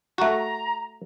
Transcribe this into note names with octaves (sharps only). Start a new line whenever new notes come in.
A3 F#4 A#5